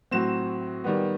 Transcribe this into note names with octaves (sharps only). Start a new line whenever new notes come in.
A2 F#3 C4 E7
D#3 G3 B3